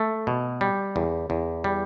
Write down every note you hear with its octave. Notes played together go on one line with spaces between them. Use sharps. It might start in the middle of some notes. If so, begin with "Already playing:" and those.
Already playing: A3
B2
G3
E2
E2
G3